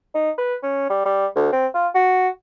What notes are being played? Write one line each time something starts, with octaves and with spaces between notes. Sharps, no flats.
D#4
B4
C#4
G3
G3
D2
C4
F4
F#4